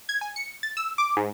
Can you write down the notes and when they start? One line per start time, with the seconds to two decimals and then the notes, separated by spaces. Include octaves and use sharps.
0.09 G#6
0.21 G#5
0.36 C#7
0.63 A6
0.77 E6
0.98 D6
1.16 G#2